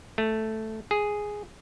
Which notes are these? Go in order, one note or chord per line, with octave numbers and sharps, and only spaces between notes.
A3
G#4